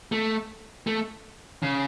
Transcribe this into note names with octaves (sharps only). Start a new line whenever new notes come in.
A3
A3
C#3